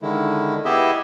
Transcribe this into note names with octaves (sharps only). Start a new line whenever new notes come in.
D3 D#3 G#3 E4
B3 E4 G4 G#4 D#5 E5